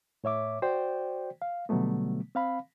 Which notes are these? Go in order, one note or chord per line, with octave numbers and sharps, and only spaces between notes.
A2 C#5 E5 D6
F#4 C5 D5 G5
F5
B2 D3 F#3 G3 A3 B3
C4 F5 B5